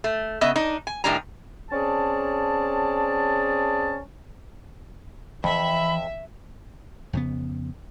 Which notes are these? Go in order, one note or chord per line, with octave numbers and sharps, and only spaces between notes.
A3
C#3 B3 D#5 E5
D4 D#4
G#5
A2 D#3 G3 D4 G#5 A#5
C4 C#4 G#4 D5 A5
F2 E3 E5 B5
F2 C#3 B3